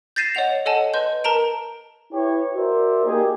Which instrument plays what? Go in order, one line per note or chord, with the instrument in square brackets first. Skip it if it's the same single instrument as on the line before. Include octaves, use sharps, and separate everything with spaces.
[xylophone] G6 A6 A#6 C7 D#7 E7
C#5 D#5 F#5 F7
A4 C#5 D#5 F#5 G#5 A5
B4 D#5 C6 G6
A#4 A5 A#5 D7
[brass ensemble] E4 G4 B4 C#5
F#4 A#4 C5 D5 E5
A#3 D#4 G4 G#4